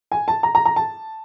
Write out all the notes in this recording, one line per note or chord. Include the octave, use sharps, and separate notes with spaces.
G#5
A5
A#5
A#5
A#5
A5